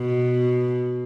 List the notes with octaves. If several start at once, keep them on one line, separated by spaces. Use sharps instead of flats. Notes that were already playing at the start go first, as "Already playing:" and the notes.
Already playing: B2